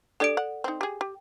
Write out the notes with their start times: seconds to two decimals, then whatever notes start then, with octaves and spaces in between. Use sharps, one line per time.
0.20 D4 G4 A4 D5 D7
0.37 F#5
0.64 C4 D#4
0.81 G4 G#4
1.01 G4